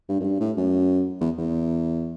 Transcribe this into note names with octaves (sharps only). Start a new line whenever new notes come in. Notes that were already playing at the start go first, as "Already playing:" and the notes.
G2
F#2
G2
A2
F#2
E2
E2